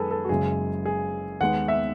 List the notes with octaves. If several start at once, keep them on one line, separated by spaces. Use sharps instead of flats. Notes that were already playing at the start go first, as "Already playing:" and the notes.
Already playing: F#2 D#3 G#3 G#4 A4 B4
A4
F#4
F#1 F#2 C#3 G#3 G#4
G#4
D#2 D#3 G#3 B3 F#5
E5